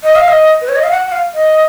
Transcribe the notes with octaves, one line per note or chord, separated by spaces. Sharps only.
D#5
F5
D#5
B4
C#5
D#5
F5
F#5
F#5
F5
D#5